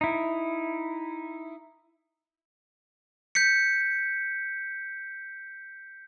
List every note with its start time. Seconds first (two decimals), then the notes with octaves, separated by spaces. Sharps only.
0.01 D#4 E4
3.35 G6 B6 C#7